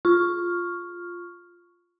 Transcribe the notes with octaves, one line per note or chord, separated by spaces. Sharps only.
F4 C#6 F6